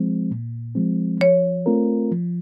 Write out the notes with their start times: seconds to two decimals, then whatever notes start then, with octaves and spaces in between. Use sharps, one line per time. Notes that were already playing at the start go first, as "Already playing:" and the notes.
Already playing: F3 G#3 C4
0.31 A#2
0.75 F3 G#3 C4
1.20 F3 C#5
1.66 A3 C4 F4 A#4
2.11 F3